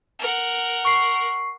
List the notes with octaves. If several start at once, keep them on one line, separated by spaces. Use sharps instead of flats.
A#4 F#5
C#6 C7